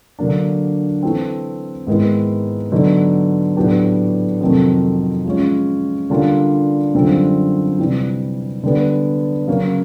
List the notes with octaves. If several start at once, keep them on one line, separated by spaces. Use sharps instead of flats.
D3 F#3 A#3 D4
E3 A3 C4
G#2 D#3 G#3 B3 E4
D3 F#3 B3 D#4
A2 F#3 B3 D4 G4
F2 C3 D#3 F#3 A3
F3 G#3 C#4
D3 G3 A#3 D4 F4
F#2 D3 G3 C4 F4
C3 E3 G3
D3 G3 B3
C#3 F#3 A#3 C#4